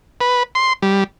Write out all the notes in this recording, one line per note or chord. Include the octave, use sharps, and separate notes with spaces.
B4
C6
G3